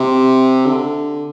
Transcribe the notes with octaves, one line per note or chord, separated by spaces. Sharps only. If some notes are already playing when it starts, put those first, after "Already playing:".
Already playing: C3
D3